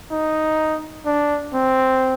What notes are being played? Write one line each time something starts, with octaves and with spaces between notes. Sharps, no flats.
D#4
D4
C4